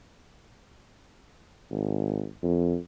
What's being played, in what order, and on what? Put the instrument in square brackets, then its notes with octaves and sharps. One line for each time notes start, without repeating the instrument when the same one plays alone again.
[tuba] G#1
F2